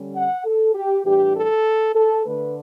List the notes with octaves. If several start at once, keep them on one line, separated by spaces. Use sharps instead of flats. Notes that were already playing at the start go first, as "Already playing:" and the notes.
Already playing: D3 G3 C#4
F#5
A4
G4
A2 E3 G3 D4 G4
A4
A4
D3 A3 D4 B4